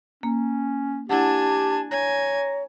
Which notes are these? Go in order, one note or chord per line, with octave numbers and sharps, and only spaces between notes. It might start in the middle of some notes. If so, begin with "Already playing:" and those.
A#3 C#4
D4 E4 G4 F#5 G#5 A5
C#5 G#5 A#5